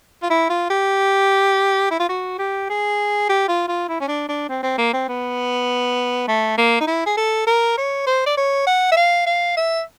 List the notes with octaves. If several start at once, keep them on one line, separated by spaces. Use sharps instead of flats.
F4
E4
F4
G4
E4
F4
F#4
G4
G#4
G4
F4
F4
E4
C#4
D4
D4
C4
C4
A#3
C4
B3
A3
A#3
D#4
E4
G#4
A4
A#4
C#5
C5
D5
C#5
F#5
E5
F5
F5
E5